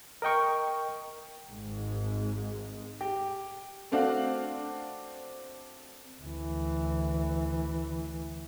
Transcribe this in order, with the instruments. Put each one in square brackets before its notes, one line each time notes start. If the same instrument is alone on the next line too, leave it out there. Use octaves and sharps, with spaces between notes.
[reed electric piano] A#4 D#5 G5 C#6
[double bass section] G#1 G#2 G#3
[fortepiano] G4
[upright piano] A3 C4 D4 F#4 F5
[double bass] D2 E3